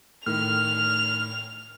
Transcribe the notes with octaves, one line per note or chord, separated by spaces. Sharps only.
A2 D#3 F6 F7